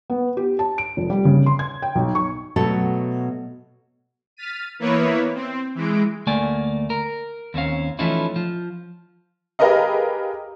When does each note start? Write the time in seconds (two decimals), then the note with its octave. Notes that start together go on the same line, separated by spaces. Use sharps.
0.10 B3
0.37 G4
0.59 A5
0.78 D7
0.97 F1
1.10 G3
1.25 C#3
1.46 C6
1.59 G#6
1.82 G5
1.95 B1
2.15 C#6
2.56 B2 F#3 A3 A4
4.37 F6 A6 B6 D#7
4.79 E3 A#3 B3 E4 B4 C#5
5.35 C4
5.75 E3 G#3 D7
6.27 D2 A3 A#3 D5 G#5
6.90 A#4
7.54 D#2 C4 C#4 F5
7.99 E3 F3 A3 C#4 D#4 E4
8.36 F3
9.59 G4 G#4 A#4 B4 D#5 F5